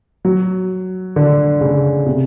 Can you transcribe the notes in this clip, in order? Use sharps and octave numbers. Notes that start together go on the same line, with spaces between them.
F#3
D3
C#3
C3